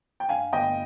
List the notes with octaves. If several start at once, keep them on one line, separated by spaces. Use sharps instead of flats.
G5
G2 F5 G#5
G1 D#5 G5